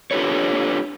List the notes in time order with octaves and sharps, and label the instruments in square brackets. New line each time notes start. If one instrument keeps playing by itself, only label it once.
[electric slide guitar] D4 F4 G4 A4 B4 C#5